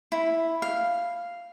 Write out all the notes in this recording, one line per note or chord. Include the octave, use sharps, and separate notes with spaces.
E4
F5